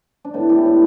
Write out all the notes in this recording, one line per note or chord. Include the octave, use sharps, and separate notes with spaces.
D4
A2 B3
E3 G4
A2